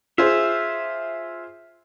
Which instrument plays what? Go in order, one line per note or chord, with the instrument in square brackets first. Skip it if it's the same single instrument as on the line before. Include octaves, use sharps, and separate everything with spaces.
[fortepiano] F4 G#4 C5 [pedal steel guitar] E5